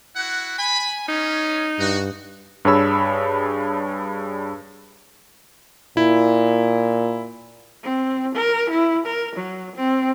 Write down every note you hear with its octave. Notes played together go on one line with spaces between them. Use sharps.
E4 F#4 F#5
G#5 B5
C#4 D#4
G2 F#4
G2 D4 G#4 C#5 B5 E6
A#2 E4
C4
A#4
E4
A#4
F#3
C4